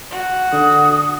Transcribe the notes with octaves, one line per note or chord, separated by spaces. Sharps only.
F#4
D3 D#6